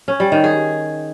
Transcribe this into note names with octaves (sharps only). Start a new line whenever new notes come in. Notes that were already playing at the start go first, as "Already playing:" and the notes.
C#4
G3
D#3
G#4